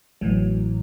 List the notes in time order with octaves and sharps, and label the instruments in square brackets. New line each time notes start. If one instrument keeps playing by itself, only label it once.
[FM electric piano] A1 A2 E3 F#3